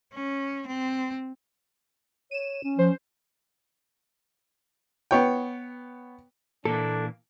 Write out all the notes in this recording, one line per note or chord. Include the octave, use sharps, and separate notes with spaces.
C#4
C4
C#5 D#7 E7
C#4
F3 C5
B3 C#5 G5
A#2 E3 A#3 D4 A4